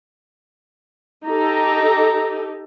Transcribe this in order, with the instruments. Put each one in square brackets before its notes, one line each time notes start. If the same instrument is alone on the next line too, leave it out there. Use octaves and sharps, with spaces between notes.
[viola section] D#4 G4 A4 [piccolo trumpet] A#5